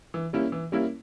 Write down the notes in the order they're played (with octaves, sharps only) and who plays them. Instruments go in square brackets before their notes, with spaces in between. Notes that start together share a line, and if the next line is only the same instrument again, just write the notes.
[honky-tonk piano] E3
G3 A#3 C#4 E4
E3
G3 A#3 C#4 E4